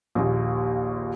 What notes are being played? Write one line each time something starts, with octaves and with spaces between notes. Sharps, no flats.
A#1 D#2